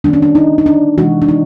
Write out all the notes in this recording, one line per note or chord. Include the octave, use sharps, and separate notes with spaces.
D#3 G3 A#3 D4
C#4
D4
D#4
D#4
D4
C3 E3 G#3 F#4
D4
D#4